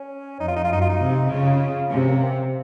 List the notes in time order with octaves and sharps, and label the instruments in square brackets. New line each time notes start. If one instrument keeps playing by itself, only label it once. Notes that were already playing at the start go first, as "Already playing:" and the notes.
Already playing: [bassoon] C#4
[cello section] F2 [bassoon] D#4
[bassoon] F4
D#4
F4
[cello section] F#2 [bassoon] D#4
[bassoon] F4
D#4
[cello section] C3
[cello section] C#3 [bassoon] F4
[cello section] C3 [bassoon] C#4
[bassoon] A#3
C4